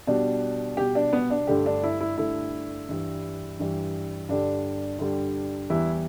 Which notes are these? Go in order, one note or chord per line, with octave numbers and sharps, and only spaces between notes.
B2 G3 D4
B2 G3 G4
D4
B3
D4
G2 D3 A3 G4
D4
E4
E4
G2 D3 A3 E4
G2 E3 G3
G2 E3 G3
G2 D3 G3 D4
G2 D3 G3
E2 E3 G3 E4